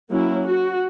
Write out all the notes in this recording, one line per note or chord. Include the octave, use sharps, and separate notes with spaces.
F#3 A#3 C#4 E4
F#4